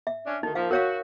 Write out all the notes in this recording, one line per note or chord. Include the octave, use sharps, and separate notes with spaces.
E5
C#4 D4
D2 D#3 D#4
F3 A#3 F5
F#4 A#4 C#5 F5